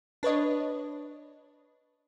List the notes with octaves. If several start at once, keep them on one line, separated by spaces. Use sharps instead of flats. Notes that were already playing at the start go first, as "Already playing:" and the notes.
D4 B4 C#5 D#5